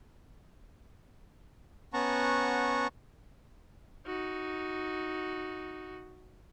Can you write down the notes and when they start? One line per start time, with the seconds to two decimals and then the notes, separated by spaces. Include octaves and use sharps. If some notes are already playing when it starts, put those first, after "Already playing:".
1.94 B3 C#4 F#5 A5 A#5 C#6
4.06 D#4 F#4